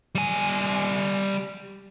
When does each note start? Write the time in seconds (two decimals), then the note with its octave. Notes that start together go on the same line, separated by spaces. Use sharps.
0.15 G3 G#5